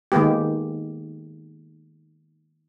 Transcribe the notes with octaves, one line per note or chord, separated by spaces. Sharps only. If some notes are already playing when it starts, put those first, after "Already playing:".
D#3 G#3 A#3 B3 G4